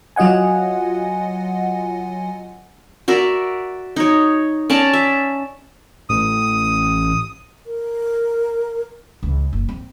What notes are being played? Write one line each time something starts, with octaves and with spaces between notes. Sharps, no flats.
F#3 F4 D#5 F#5 G#5
F#4 A#4 D5 E5
D#4 C#5
C#4 D5 A5 A#5
E5
A1 D#6
A#4
C#2
F#1
C4